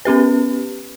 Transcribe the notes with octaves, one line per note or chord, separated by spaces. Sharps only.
B3 C#4 G4 B4